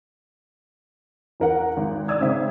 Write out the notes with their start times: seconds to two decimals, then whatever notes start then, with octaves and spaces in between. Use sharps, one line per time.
1.40 E2 A#4 F#5
1.77 G#1
2.08 D5 D#6 E6 G#6
2.21 G#2 C#3 C4 E5